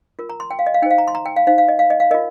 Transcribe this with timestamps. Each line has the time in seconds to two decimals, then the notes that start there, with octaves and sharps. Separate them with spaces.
0.19 F4 A#4
0.29 A#5
0.40 C6
0.51 G5
0.59 F5
0.66 D#5
0.74 F5
0.82 D#4 G5
0.86 C5 F5
0.98 A#5
1.08 C6
1.15 A#5
1.25 G5
1.36 F5
1.47 D#4 C5 F5
1.58 F5
1.68 D#5
1.79 F5
1.90 D#5
2.00 F5
2.11 F4 A#4 D#5